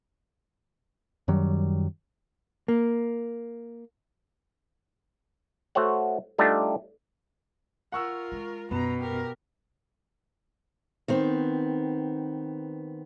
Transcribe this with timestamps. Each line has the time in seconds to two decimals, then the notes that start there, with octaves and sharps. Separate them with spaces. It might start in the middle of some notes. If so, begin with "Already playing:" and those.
1.28 F#2 D#3 F#3 G3
2.68 A#3
5.75 A3 F#4 C5 C#5 F#5
6.38 G3 A3 D4 D#4 F4 G4
7.92 F4 A#4 F#5 C#6 E6
8.32 G#3
8.71 F#2 B2 B3 A#5
8.99 G4 A#4
11.08 D#3 B3 C4